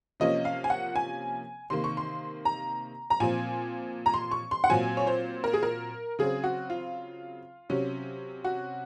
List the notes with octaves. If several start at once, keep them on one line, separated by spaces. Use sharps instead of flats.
C3 F3 A#3 C#4 D#5
F5
G#5
F#5
G#5
C3 D#3 A#3 C6
C#6
C6
A#5
A#5
A#2 F3 C4 G#5
A#5
C6
C#6
C6
F#5
A#2 F#3 C4 G#5
C#5
C5
A#4
G#4
A#4
C#3 F#3 C4 G#4
F#4
F4
C3 F#3 C#4
F#4